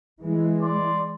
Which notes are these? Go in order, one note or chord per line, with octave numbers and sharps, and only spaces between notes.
E3 G#3
D5 C6